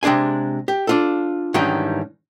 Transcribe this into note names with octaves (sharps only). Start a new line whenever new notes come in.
C3 G#3 D4 G#4 G#5
G4
D4 F4 A4
G#2 D#3 E3 G3 C#4 D4